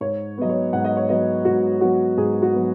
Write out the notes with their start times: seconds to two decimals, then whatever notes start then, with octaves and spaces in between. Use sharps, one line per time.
0.01 G#2 C#5
0.38 F#3 B3 D#5
0.49 C#5
0.73 G#2 F#5
0.85 D#5
0.97 C#5
1.09 F#3 B3 D#5
1.45 G#2 F#4
1.81 F#3 B3 F#4
2.17 G#2 G#4
2.42 F#4
2.54 F#3 B3